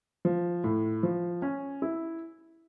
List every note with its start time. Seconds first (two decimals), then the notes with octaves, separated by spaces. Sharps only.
0.25 F3
0.64 A2
1.03 F3
1.42 C#4
1.82 E4